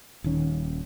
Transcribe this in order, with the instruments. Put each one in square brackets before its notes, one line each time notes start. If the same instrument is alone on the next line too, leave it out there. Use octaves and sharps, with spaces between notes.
[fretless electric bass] D#1 D#3 C#4